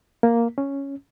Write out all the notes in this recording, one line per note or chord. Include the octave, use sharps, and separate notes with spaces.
A#3
C#4